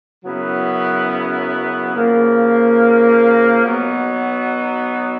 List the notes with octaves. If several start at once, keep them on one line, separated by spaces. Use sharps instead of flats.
F#2 C#3 F#3 B3 E4
C#3 F3 A#3
B2 F#3 B3 D#4